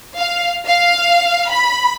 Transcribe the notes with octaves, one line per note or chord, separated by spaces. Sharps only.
F5
F5
B5